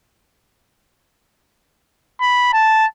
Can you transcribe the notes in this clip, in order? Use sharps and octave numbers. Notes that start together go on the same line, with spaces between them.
B5
A5